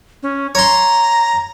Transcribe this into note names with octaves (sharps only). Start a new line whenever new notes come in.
C#4
C#5 A#5 C6